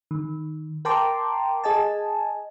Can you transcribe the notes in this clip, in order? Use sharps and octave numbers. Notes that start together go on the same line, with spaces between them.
D#3
A#4 G5 A5 A#5 C6 D6
G#4 D#5 G#5 A5